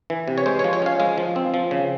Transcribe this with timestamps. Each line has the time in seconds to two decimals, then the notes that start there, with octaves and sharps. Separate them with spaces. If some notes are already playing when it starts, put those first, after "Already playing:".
0.10 E3
0.28 C3
0.38 C#5
0.46 G#3 C5
0.59 C#5
0.64 F3
0.73 C#5
0.82 C#4 F5
1.00 G#3 F5
1.18 F3
1.36 C4
1.54 F3
1.71 C#3